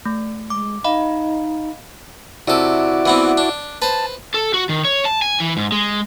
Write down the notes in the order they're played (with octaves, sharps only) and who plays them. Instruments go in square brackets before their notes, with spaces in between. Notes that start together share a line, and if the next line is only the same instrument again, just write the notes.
[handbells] A3
[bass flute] G#3 [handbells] D6
[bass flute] D#4 [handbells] D#5 F5 B5
[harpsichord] C3 A4 [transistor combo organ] E4 F#4 D5
[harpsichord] E3 B3 C4
D4
[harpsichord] B4 C5 [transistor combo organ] A5
[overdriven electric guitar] A4
F#4
D#3
C#5
A5
G#5
E3
G#2
G#3